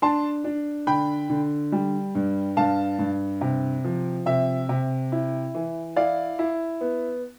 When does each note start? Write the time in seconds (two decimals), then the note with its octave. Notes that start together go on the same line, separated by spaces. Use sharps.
0.02 D4 A5 C6
0.44 D4
0.87 D3 G5 B5
1.30 D3
1.72 G3
2.15 G2
2.57 G2 F5 A5
2.99 G2
3.41 C3
3.84 F3
4.26 C3 E5
4.69 C3
5.12 E4
5.55 E3
5.96 E4 D5 F5
6.39 E4
6.81 B3